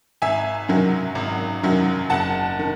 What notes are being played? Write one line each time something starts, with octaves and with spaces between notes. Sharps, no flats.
G#1 E5 G#5
F#2 D#3 F#3
G#1
F#2 D#3 F#3
F#1 F#5 A5
D#3